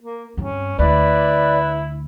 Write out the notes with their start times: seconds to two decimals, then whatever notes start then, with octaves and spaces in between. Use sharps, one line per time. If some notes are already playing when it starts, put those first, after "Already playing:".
0.02 A#3
0.37 G2 C4 C#4
0.79 D2 E4 B4 D5